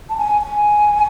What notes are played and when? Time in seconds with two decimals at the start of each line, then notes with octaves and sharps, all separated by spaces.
0.10 A5
0.18 G#5
0.42 G#5